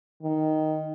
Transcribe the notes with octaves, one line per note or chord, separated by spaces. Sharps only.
D#3